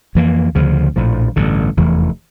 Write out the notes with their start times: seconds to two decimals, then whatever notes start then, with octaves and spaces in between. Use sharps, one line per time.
0.15 F2 E3 A#3
0.55 D2 C#3 F3
0.96 A#1 A2 F3
1.36 A1 G2 D3
1.77 F1 E2 E3 A3